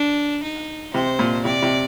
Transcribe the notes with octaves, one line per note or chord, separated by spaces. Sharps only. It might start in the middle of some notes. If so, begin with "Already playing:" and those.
Already playing: D4
D#4
C3 C5
A#2
C3 D5
C3